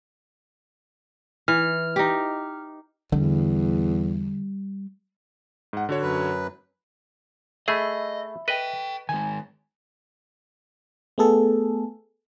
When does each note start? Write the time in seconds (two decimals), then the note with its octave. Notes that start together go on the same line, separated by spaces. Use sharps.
1.48 E3 F6
1.96 D#4 G4
3.12 E2 D3 G3
5.73 G#2 F#5
5.89 D3 F#4 C#5
6.02 F#2 F#3 B4
7.68 A3 G#4 D#5 E5 B5
8.48 A4 B4 D#5 G5
9.09 D#3 G#3 G#5
11.18 A3 B3 G#4 A4